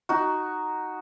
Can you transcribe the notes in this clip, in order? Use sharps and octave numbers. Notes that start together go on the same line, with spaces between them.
D#4 F#4